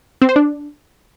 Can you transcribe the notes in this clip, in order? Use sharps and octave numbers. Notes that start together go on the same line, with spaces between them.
C4
C5
D4